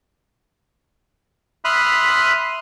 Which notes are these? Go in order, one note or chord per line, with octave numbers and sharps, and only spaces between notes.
E5 B5 C6 D#6 F6 F#6